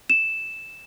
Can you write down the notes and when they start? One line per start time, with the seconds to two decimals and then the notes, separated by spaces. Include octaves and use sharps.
0.10 E7